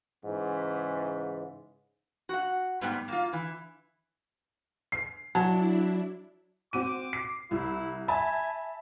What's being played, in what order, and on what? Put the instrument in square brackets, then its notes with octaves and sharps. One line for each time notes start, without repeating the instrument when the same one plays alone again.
[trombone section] G#2 C#3 E3
[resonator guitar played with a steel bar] F#4 F#5
G#2 G3 B3 G5
A#3 F4
E3
[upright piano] C7
[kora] F#3 [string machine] D4 E4 [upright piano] A5
[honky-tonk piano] C4 F#4 D#7 [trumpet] D6
[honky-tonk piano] C7
[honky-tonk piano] C2 [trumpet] E4
[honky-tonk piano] E5 A5 B5 [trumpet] G#5